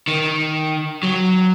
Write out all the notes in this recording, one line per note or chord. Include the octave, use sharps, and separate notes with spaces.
D#3
F#3